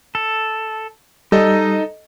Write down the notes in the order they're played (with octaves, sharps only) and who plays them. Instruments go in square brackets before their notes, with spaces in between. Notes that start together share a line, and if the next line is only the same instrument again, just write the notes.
[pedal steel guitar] A4
[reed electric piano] G3 [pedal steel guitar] D#4 [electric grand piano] A4 D#5